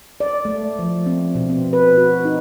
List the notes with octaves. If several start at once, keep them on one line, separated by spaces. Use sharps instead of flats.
D5
A3
F3
C4
B2
C4
B4
F#4
D#4